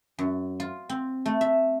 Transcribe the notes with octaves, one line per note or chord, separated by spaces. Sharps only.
F#2
F4
C4
A3
E5